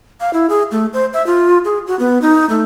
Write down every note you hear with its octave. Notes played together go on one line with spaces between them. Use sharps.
F5
E4
G#4
A3
C5
E5
F4
G#4
F#4
B3
D#4
A3